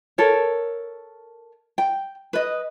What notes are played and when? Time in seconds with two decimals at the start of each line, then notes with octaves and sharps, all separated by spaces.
0.18 A4 A#4 C#5
1.78 G5
2.33 B4 D#5